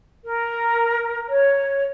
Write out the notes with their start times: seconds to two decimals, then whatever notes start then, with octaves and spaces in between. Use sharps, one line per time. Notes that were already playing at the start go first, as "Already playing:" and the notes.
0.25 A#4
1.30 C#5